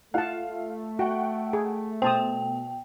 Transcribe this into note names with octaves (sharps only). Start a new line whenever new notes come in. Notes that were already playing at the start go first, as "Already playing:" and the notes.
A3 F4 F5 F#5 A5
F#4 F#5 G5
G#4
B2 C5 G5 A5 D#6